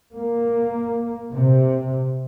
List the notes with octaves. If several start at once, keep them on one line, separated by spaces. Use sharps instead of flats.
A#3
C3